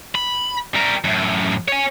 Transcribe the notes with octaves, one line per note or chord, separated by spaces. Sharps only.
B5
G3 A#4
F#2 A2
C#5 G#5